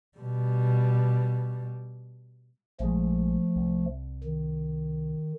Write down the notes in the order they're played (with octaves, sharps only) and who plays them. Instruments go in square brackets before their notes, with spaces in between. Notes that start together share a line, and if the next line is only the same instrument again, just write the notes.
[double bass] B2 G3
[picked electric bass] A#1 G#3 [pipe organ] F3 A3
[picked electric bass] C2
[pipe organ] D#3